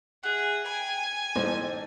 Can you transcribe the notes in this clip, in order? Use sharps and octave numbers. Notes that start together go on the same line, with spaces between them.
F#4 G#4 E5
G5 G#5 B5
A1 G#2 A4 C5 D#5